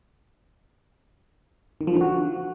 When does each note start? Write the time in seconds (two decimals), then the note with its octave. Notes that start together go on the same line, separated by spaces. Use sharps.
1.81 D#3
1.87 F3
1.94 D3
2.01 F#4